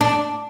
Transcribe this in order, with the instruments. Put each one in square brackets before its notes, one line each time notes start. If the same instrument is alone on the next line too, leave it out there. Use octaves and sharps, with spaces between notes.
[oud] D4